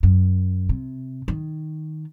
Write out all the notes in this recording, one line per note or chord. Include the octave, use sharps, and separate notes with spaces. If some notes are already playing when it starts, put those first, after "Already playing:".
F#2
C3
D#3